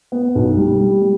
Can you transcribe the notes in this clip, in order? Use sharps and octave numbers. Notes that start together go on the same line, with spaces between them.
B3
B1
G3
G3
G3